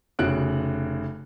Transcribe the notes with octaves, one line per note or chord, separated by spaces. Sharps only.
F1 C#3 F#4 F#6 D7